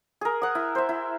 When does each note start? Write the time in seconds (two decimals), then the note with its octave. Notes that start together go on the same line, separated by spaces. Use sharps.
0.21 G#4 A#4
0.42 F#5 D#6
0.55 E4
0.75 C5 E5
0.89 E4